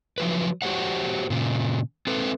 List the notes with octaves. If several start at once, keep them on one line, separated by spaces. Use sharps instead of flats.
F3 F#3 B4
F#4 G4 C5 C#5 F#5
A#2 C#3
C4 A4 B4